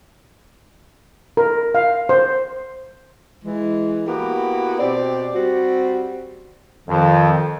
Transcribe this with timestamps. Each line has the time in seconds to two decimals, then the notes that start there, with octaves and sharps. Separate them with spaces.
1.37 A#4
1.75 F5
2.09 C5
3.45 E3 G#3
4.07 A#3 B3 E4 F#4 G4
4.79 B2 C4 G4 D5
5.35 G3 C4 F#4
6.88 F2 D#3